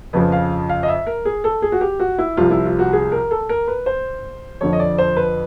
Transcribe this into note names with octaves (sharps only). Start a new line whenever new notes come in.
F2 C#3 F3 B4
F5
F5
D#5
E5
A#4
G#4
A4
G#4
F#4
G4
F#4
E4
C2 C3 F3 F4
E4
F4
F#4
G#4
A#4
A4
A#4
B4
C5
F2 D3 F3 C#5
D#5
D5
C5
B4